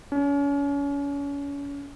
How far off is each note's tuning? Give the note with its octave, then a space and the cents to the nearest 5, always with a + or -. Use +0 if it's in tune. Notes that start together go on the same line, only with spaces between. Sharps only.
C#4 +35